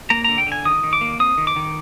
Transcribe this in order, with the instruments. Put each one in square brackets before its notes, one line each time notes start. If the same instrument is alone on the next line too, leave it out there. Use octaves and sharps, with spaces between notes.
[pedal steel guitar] A#3 A#5
D3 A#5
G5
D3 G#5
D#3 D#6
D#3
D6
A#3
C4 D#6
D#3
D6
D#3